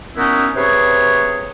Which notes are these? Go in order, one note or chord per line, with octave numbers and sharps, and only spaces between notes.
A#2 B3 C#4 D#4 E4 F#4
C3 G#4 B4 C#5